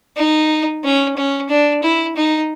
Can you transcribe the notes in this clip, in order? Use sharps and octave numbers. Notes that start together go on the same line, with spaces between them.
D#4
C#4
C#4
D4
E4
D#4